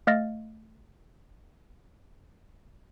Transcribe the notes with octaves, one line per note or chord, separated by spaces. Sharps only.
A3 D#5 F5 F6 A6 A#6